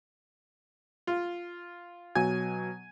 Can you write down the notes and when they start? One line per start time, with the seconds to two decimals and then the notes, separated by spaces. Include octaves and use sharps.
1.07 F4
2.15 B2 F#3 G#5